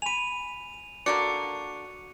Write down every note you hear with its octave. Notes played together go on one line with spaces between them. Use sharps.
G#5 B5 D#7 F7
D3 A#3 D4 F#4 C#7